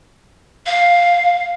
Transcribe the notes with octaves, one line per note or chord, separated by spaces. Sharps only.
F5